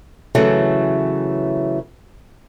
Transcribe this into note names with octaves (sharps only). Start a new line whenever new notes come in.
C#3 E3 F#3 A3